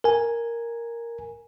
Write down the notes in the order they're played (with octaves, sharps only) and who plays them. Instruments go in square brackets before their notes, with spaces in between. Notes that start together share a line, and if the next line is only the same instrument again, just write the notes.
[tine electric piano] A#4 G#5